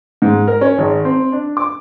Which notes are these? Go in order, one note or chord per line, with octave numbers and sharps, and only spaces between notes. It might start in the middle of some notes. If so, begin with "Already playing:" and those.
G#2
A#4
C#4
G#1
C4
D4
D6